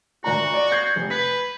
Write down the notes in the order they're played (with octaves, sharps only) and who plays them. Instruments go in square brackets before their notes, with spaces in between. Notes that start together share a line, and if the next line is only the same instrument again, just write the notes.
[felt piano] D2 D4 A#5 [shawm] F#4
[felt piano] D5
G6 G#6 C7
F1
[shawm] B4 [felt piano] B6